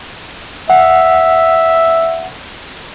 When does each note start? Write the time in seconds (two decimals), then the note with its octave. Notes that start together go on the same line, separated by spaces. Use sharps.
0.70 E5 F#5